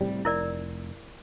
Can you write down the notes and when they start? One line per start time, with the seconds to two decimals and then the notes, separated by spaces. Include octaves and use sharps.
0.01 A2 C3 G3
0.25 F1 E4 A#4 D5